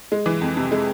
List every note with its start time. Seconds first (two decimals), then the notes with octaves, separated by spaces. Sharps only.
0.12 G#3
0.26 E3
0.41 F2
0.57 C3
0.72 G#3